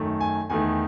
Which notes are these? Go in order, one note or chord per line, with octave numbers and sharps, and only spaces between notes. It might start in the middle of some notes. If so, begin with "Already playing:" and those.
Already playing: F#2 D#3 A3
G#5
E2 D#3 A3 G#5